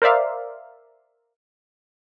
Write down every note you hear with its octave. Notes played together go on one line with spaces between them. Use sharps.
A#4 C5 D5 E5 F5